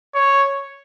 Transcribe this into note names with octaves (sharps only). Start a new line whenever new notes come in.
C#5